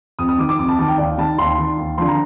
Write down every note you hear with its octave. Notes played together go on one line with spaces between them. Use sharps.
F2 D#6
D#6
D#3 D6
D6
F2 D6
A5
D#3 A5
G5
D#2 D5
D#3 A5
D#2 C6
D#3
D#2
D3 F3 C6
A#5